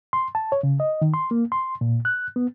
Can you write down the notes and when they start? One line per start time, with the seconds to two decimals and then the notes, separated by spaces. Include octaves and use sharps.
0.13 C6
0.35 A5
0.52 C#5
0.63 C#3
0.80 D#5
1.02 D#3
1.14 C6
1.31 A#3
1.52 C6
1.81 A#2
2.05 F#6
2.36 B3